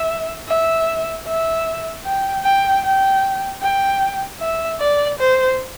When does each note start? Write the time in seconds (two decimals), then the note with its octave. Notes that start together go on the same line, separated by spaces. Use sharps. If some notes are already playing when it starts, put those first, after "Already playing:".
Already playing: E5
0.48 E5
1.27 E5
2.05 G5
2.44 G5
2.84 G5
3.62 G5
4.41 E5
4.80 D5
5.19 C5